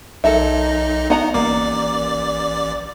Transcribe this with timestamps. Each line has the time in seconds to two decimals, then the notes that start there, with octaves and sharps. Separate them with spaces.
0.24 B1 D#4 A4 A#4 D#5 E5
1.10 B3 D#4 F#5 A#5
1.34 A1 A#3 D5 D6